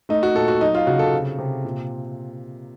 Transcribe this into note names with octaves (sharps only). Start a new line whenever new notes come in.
A3 D#4
F#4
A#2 A4
F#4
F#3 D#4
F4
C#3 F#4
A4
C3
C3
A#2